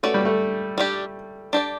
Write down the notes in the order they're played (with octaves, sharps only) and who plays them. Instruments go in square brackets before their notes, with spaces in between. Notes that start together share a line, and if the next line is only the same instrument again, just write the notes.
[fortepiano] A3 [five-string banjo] C#4 F#4 B4 D5
[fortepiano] G3
A3
[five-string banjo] G3 D4 G4
D4 G4 D5